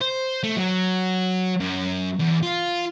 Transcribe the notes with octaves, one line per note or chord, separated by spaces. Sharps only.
C5
A3
F#3
F#2
E2
F4